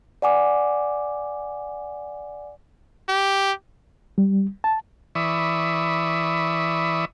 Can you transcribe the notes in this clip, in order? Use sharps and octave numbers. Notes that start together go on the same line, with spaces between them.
D5 F#5 G#5 D6
G4
G3
A5
E3 D5 E5 B5 C#6 D#6